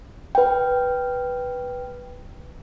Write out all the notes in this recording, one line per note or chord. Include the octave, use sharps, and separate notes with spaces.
B4 G5